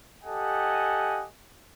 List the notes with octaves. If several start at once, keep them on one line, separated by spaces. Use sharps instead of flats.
G4 A4 D#5 F#5 G#5